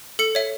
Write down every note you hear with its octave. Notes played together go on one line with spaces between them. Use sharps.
A4 C#7
C#5 E5